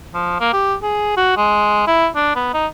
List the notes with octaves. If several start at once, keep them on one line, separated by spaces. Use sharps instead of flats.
F3
A#3
G4
G#4
F#4
G#3
E4
D4
B3
D#4